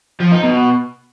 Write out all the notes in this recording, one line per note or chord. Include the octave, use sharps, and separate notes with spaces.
F3
D#4
B2